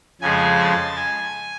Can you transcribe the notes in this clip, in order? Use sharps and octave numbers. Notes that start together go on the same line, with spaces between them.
F2 C#3 F3 G#3 G#5
A5
G#5